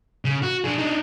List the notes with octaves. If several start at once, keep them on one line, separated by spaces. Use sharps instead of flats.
C#3
F#4
D4 G#4
D4 D#4